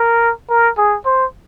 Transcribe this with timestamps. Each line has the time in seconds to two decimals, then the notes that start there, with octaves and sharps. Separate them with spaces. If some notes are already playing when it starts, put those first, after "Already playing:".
Already playing: A#4
0.50 A#4
0.77 G#4
1.05 C5